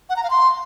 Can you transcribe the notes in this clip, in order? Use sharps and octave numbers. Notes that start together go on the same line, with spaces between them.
F#5
A#5
F5
C6